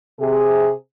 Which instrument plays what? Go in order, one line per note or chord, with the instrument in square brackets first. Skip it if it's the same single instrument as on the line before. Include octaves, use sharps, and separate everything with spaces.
[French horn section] C3 G#4